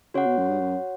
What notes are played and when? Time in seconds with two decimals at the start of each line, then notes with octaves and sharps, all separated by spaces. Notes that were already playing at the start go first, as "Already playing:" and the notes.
0.14 C#3 F#4 C#5 F#5
0.26 B2
0.38 F#2
0.48 G2
0.60 F#2